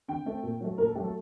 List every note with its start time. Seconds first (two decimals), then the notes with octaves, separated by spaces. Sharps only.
0.08 D3 G5
0.25 A3 C4
0.43 A#2
0.60 F#3 A3
0.78 A#2 A#4
0.87 A4
0.95 A3 G4
0.98 F#3
1.04 A4